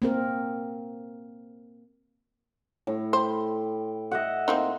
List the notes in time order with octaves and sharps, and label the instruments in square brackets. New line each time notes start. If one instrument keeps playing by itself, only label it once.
[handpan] A#3 C4 A#4
[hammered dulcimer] A2
[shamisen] C5 [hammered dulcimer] G5 B5
[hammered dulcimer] D#5 E5 F#5
[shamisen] A#3 C4 D#4